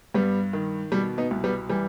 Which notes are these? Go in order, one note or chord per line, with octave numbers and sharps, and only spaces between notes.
G2 G3 B3
D#3
B2 G3
B3 D#4
C2
G3 B3
E3 G3